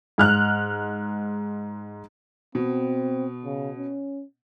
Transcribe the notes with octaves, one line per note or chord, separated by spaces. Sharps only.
G#2 F6 F#6
B2 C4
C#3
C#4